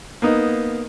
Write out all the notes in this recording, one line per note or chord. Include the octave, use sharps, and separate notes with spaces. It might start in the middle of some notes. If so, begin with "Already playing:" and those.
A#3 B3 D#4